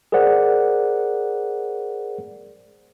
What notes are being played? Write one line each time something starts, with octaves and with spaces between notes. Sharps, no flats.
G#4 A#4 C5 D5 F#5